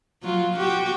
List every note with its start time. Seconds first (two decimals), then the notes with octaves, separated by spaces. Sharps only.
0.23 F#3 F4
0.57 F#4 G4